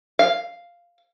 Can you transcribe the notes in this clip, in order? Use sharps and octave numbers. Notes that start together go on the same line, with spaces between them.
F5